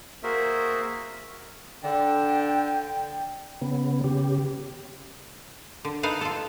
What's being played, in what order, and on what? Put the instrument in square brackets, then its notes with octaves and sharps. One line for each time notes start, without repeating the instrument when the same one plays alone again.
[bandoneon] A#3 F#4 G#4 A#4 C5 E5
[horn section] D3 [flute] G5
[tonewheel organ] C#3 B3
C#3 G4
[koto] D3
D#4 A4 B4 F5 F#5
F4 A4